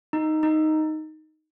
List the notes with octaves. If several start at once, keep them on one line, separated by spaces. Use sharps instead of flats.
D#4
D#4